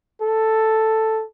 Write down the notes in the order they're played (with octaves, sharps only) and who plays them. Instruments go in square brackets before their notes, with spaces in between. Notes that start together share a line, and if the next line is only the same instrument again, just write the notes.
[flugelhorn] A4